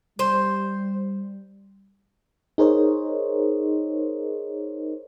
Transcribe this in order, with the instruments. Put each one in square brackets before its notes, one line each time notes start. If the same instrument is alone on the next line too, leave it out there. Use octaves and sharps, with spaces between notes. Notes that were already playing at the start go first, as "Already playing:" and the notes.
[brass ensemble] G3 [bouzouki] C5
[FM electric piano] D#4 G#4 A#4 C5 C#5 D#5